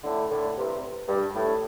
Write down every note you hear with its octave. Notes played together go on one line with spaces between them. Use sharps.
A2 D3
A2 D3
G2 C3
G2
A2